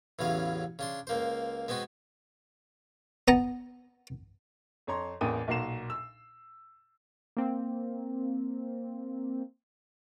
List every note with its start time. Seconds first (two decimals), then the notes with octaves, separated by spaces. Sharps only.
0.19 A1 E2 C#3 F#3 F5
0.79 C#3 D4 C6
1.07 C#2 A#3 C5
1.68 G#3 B3 C4 F#4
3.28 B3 A5 A#5
4.87 F2 C#5 A#5 C6
5.21 A1 E2 A#3 G5 D#6 D#7
5.48 B1 A#2 F#4 A#4 C7 E7
5.90 E6
7.37 A#3 C4